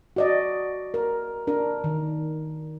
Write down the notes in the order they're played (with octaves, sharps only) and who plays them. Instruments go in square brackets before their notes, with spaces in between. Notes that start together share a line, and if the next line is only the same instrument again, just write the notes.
[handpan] F#4 D5 D#5
A#4
D4 A#4
D#3